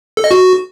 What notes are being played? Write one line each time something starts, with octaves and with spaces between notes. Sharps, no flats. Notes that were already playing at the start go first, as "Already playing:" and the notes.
A4
D#5
F#4